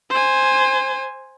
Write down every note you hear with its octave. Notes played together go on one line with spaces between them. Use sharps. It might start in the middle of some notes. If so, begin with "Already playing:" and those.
C5 G#5